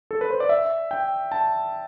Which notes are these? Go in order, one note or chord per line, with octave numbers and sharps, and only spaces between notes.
A4
B4
C5
D5
E5
G5
A5